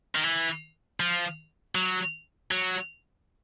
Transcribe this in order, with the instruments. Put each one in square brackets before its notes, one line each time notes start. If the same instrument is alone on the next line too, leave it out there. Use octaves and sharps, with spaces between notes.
[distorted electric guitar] D#3
E3
F3
F#3
F#3